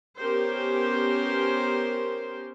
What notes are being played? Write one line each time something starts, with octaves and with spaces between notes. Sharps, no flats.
B3 C#4 G4 A#4 C5